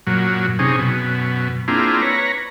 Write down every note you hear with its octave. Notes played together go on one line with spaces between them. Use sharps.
F#2 A#2 F#3
C3 C#4 D#4 G#4
F#2 B2
A#3 C4 D4 E4 F4 G#4
B4 C#5 A#5